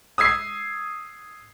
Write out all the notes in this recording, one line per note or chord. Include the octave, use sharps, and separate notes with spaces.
D#6 E6 G#6 C7